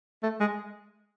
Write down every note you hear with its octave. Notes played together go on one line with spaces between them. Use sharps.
A3
G#3